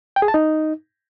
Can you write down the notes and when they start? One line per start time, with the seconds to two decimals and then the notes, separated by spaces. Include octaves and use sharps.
0.16 G5
0.22 G#4
0.28 A5
0.34 D#4